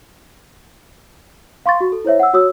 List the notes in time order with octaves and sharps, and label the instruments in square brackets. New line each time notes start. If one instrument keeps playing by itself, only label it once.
[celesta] F5 C6 C#6 A6
F#4
A4
E4 C5 C#5 E5
F#5 E6
F#4 C#5 D#6 E6